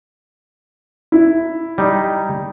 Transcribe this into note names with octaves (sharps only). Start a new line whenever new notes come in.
E4
G3 D#4